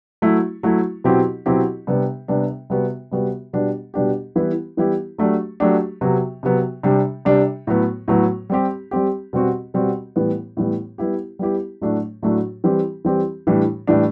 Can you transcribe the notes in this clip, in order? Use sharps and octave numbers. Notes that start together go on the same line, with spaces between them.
F#3 A3 E4
F#3 A3 E4
B2 F#3 C4 E4 G4
B2 F#3 C4 E4 G4
C3 G3 B3 D4
C3 G3 B3 D4
C3 G3 B3 F#4
C3 G3 B3 F#4
B2 G3 B3 D4 G4
B2 G3 B3 D4 G4
E3 G3 B3 E4 G4
E3 G3 B3 E4 G4
F#3 A3 D4 G4
F#3 A3 D4 G4
C3 F#3 B3
C3 F#3 B3
C3 G3 D4
C3 G3 D4
A2 F#3 B3
A2 F#3 B3
G3 C4 G4
G3 C4 G4
B2 G3 C4 F#4
B2 G3 C4 F#4
A2 E3 G3 B3
A2 E3 G3 B3
G3 B3 E4 G4
G3 B3 E4 G4
A2 F#3 A3 D4 F#4
A2 F#3 A3 D4 F#4
E3 G3 C4 G4
E3 G3 C4 G4
A2 E3 G3 D4
A2 E3 G3 D4